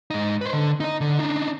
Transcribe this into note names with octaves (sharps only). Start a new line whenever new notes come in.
G#2 D#4
B4 C5
D3
D#4 D#5
D3
D4 D#4